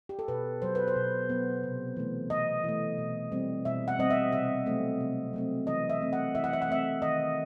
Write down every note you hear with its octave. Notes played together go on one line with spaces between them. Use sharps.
G4
A4
B2 B4
F#3 B3 C5
B4
C5
B2
F#3 B3
C3
E3 A3
C3 D#5
E3 A3
B2
G3 C4
B2 E5
F#5
G3 C4 D#5
E5
C3 E5
F#3 A3 C4
C3
F#3 A3 C4
E3 D#5
E5
A3 C4
F#5
E3 E5
F#5
E5
F#5
A3 C4 E5
D#3 D#5